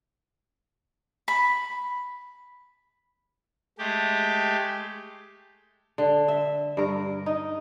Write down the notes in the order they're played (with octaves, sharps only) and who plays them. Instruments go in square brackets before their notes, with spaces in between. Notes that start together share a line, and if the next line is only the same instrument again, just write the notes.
[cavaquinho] B5
[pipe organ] G#3 A3 G4
[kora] D3
E5
G2 A#4
D#4